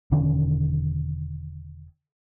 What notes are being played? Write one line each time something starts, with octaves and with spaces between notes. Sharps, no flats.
E1 D3 D#3 C#4